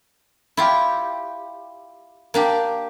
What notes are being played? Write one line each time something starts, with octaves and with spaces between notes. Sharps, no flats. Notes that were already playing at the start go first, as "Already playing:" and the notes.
E4 F4 G4
A#3 D4 G4